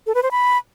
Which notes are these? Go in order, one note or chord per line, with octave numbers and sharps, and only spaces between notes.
A4
B4
C5
B5